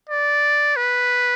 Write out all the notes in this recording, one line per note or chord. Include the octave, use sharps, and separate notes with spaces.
D5
B4